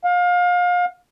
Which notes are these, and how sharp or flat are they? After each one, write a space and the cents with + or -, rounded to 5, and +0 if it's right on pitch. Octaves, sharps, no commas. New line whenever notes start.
F5 +30